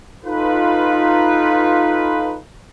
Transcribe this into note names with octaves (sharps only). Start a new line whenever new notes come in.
D#4 F4 A4 B4